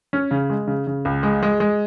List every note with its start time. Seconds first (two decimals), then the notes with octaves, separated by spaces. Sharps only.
0.13 C#4
0.31 C#3
0.50 G#3
0.67 C#3
0.87 C#3
1.05 C#2
1.23 G#3
1.43 G#3
1.60 G#3